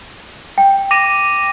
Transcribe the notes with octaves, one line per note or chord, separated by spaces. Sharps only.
G5
D6 A#6 D#7